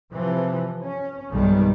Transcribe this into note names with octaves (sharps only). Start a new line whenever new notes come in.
C3 E3 F3
C#4
B1 G2 D#3 G3 G#3